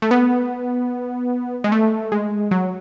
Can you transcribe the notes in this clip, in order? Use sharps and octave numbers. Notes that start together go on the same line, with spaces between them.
A3
B3
G#3
A3
G#3
F#3